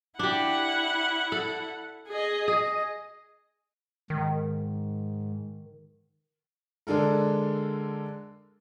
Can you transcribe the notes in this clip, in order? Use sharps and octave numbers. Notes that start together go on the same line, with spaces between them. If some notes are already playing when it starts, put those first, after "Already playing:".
D4 E4 G4 F#5
A4
G#4 D#5
G#4 D#5
G#2 D#3
D3 G#3 D4 A4 A#4